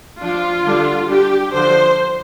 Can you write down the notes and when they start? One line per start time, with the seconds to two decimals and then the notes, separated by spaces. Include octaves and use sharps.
0.21 F3 D4 F4
0.66 D3 G3 D4
1.10 G3 D4 G4
1.54 D3 F3 D4 C5